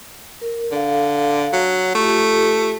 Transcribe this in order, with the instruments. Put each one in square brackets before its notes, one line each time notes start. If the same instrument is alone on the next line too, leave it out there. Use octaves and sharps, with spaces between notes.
[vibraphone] A#4
[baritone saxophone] D3 [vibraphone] A4 F5
[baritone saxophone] F#3
[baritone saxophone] A3 [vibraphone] F4 G4 A4